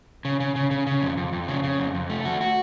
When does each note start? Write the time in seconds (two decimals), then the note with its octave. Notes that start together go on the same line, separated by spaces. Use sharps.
0.25 C#3
0.40 C#3
0.56 C#3
0.71 C#3
0.87 C#3
1.02 F2
1.17 F2
1.33 F2
1.48 C#3
1.63 C#3
1.79 F2
1.95 F2
2.10 A3
2.25 F#4
2.41 F#4